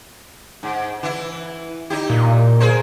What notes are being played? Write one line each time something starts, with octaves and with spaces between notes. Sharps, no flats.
G#2
E3 E4
D#4 E4 G4
A#2
G#4 A#4 C5